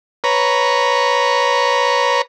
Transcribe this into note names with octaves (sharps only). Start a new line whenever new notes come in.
B4 C#5 A#5